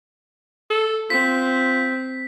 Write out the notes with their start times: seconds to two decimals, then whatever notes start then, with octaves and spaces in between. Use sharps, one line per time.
0.70 A4
1.10 C4 F4 B6